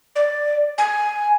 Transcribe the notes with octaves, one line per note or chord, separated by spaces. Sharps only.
D5
G#5